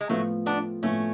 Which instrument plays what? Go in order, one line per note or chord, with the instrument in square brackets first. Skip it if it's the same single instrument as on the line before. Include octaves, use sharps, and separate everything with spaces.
[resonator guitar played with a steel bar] G#3
[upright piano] A2 F3 B3 F4 [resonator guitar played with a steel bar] F#3 A3
[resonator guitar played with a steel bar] B3 D4
[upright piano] A2 F3 B3 F4 [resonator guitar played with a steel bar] A3 C#4